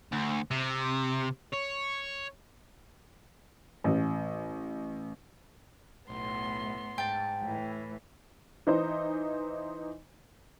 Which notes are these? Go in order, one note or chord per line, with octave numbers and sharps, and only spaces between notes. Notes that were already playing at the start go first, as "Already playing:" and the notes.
D2
C3
C#5
A1
B1 A2 B3 C6
G#2 G5 A5
A2 E3
E3 D#4 C5